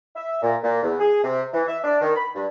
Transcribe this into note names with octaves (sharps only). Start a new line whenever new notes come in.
E5
A#2
A#2
E2
G#4
C3
E3
E5
D4
D#3
B5
G2